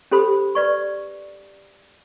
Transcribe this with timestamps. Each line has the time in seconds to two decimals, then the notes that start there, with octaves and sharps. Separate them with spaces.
0.11 C#4 G4 A4 C5 B5 D#6
0.55 B4 D5 C#6